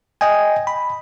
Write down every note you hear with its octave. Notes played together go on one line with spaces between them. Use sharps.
D#5 G5 G#5
B5